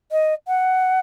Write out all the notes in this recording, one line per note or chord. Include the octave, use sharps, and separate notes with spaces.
D#5
F#5